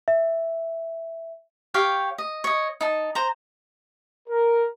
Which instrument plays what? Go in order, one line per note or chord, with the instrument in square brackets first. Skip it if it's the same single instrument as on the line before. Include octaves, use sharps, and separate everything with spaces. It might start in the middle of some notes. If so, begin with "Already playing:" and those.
[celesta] E5
[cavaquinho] G4 C#5 F5 G5
D#5
C#5 D#5
D#4 A5
C5 A#5
[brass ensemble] A#4